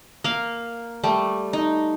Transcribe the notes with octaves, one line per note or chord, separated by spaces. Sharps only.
A#3 F5
G3 A3
D#4